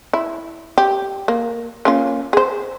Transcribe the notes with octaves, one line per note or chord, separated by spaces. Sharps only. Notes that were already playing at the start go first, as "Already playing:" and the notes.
E4
G4
A#3
A#3 C#4 F4
G#4 C5